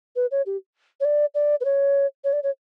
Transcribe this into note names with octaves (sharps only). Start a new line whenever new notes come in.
B4
C#5
G4
C#5
D5
D5
B4
C#5
C#5
D5
C#5